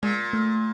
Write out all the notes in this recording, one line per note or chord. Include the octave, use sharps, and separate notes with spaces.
A#2 G#3
A3